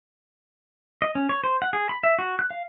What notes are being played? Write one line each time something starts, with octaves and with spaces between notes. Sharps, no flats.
D#5
C#4
C#5
C5
F#5
G#4
B5
E5
F#4
F#6
F5